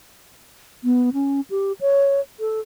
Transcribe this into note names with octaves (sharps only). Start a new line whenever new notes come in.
B3
C#4
G4
C#5
A4